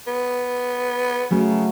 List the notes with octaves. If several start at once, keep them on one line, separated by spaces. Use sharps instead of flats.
B3
C#3 F#3 A3